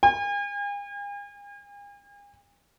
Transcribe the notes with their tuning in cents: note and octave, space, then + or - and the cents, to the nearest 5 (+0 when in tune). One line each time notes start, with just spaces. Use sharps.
G#5 -45